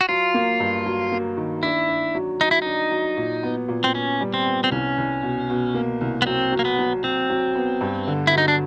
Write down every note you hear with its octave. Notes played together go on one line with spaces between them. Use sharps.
F#4
F#3 F4
A#3
G2
F#3
A#3
D#3
D4 E4
D4
F#3
F#3 D#4
E4
D4 D#4
F#3
A#2
B3
A#2
C4
B3 C#4
G3
C4
B3
C4
C2 C#4
C2
B2
B2
A#3
C2
B3
F#3 C4
F#3
A#3
B3
F#3
F#3 C4
F#3
B3
G2
D3
E4
F#3 D#4
D4